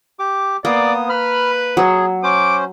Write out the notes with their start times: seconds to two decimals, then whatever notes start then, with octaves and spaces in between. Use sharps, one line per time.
0.19 G4 D6
0.65 A#3 B3 D5 D#6
1.09 B4 B5 F6
1.77 F#3 G#4
2.23 C#4 C5 D6